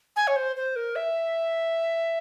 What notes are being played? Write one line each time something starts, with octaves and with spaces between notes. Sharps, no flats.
G#5
C#5
C5
C5
A#4
E5